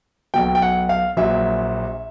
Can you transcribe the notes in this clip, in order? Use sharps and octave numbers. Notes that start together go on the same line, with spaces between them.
B1 B2 F#3 G5
G5
F#5
F5
A#1 A#2 F#3 E5